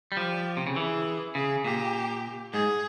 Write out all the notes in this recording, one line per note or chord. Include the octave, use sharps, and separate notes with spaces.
G3
F3 G4
C3
C#3
E3 G#4
C#3 G#4
A#2 G4
G#2 G#4